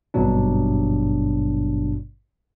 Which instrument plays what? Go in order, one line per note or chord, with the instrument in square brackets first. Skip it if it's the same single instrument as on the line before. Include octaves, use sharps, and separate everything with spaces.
[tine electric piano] G#1 G2 B2 F#3 D4